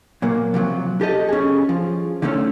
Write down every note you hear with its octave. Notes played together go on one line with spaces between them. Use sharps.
A#2 F#3 A#3
C3 F3 F#3
G4 A4 D#5
C#4 G#4
F3
D3 D#3 F3 A3 C#4